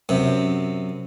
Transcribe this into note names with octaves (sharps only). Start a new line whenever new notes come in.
F#2 C3